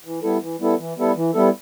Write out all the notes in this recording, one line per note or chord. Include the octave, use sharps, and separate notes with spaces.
E3
G3 B3 E4 A4
E3
G3 B3 E4 A4
E3
G3 B3 E4 A4
E3
G3 B3 E4 A4